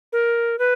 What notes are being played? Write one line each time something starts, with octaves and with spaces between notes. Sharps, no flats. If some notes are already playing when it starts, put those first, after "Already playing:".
A#4
B4